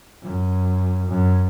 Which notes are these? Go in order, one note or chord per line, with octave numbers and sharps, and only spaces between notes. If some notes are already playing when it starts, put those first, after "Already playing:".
F#2
F#2